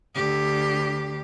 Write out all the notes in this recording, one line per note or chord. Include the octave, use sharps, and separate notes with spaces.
D2 G4